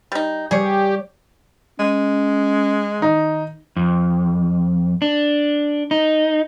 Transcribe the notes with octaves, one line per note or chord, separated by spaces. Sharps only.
G3 D#4
G3 G4 G#4 C#5
G#3 C#4
D#3 D#4
F2
D4
D#4